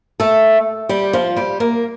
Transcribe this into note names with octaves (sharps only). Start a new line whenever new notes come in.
A3 A4
G3 G4
F3 F4
G3 G4
A#3 A#4